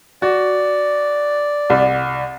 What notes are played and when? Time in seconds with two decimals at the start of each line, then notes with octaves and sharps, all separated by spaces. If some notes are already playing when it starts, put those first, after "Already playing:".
0.22 F#4 D5
1.70 C2